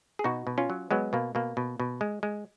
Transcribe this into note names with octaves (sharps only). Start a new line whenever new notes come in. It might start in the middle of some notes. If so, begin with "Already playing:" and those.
G#4
B2 D#4 F#4
B2
C#4 F4
F#3
F#3 G#3 B3
B2 A#3
B2 A#3
B2
B2
G#3
G#3